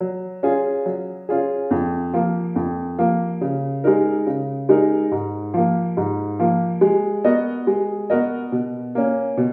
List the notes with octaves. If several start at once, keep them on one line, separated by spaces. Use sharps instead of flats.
F#3
C#4 F4 G#4
F#3
C#4 F4 G#4
F2
F3 A#3
F2
F3 A#3
C#3
G#3 D#4 A#4
C#3
G#3 D#4 A#4
G#2
F3 A#3
G#2
F3 A#3
G#3
B3 F#4 A#4 D#5
G#3
B3 F#4 A#4 D#5
B2
A#3 C#4
B2